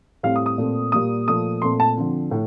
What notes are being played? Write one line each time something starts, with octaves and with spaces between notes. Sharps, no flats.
A2 G3 C4 F5
D#6
D#6
A#2 A3 C4
A#2 G3 A#3 D#6
A#2 F3 A3 D#6
A#2 A3 C4 C6
A5
D3 F3 C4
A2